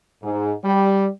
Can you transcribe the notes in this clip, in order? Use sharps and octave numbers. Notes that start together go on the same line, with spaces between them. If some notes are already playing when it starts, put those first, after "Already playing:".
G#2
G3